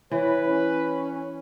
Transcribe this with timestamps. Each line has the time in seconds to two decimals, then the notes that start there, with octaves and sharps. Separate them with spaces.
0.11 E3 B4 C#5
0.45 C#4 C#5